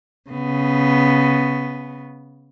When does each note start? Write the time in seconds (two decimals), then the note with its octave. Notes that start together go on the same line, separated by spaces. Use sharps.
0.30 C#3 B3